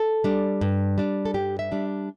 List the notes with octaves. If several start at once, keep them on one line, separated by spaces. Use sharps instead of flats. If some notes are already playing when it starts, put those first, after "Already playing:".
Already playing: A4
G3 D4
G2
G3 D4
A4
G2 G4
E5
G3 D4